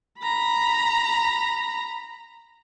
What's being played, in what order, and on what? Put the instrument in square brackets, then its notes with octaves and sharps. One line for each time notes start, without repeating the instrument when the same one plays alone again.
[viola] A#5 B5